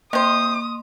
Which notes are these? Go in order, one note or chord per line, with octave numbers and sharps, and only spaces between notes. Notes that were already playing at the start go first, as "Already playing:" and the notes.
C3 A#3 C5 C6 D#6